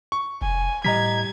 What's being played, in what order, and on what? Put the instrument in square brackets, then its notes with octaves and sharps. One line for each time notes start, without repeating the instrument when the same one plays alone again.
[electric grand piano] C#6
[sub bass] F1 [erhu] G#5
[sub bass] A2 [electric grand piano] G3 [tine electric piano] D#5 A#5 B6 [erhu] G#6